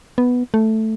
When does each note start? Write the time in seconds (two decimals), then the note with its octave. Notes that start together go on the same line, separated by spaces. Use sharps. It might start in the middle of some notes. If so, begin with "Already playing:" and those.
0.18 B3
0.54 A3